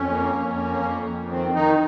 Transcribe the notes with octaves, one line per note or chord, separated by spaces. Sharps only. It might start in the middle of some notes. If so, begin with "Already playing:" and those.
Already playing: F2 C#4
A#3
F2
A#3
F2
F2
D#3 C4
D#3 D#4